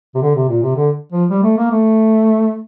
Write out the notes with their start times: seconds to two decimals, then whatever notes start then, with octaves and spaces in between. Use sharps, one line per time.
0.15 C3
0.22 D3
0.36 C3
0.49 A#2
0.63 C3
0.76 D3
1.12 F3
1.30 G3
1.43 A3
1.58 A#3
1.71 A3